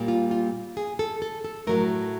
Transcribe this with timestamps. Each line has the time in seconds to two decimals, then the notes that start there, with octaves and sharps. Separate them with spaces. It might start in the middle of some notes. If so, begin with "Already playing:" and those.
Already playing: A#2 G3 A#3
0.08 F4
0.31 F4
0.77 G#4
0.99 A4
1.22 A4
1.45 A4
1.67 A2 F#3 A3 A#4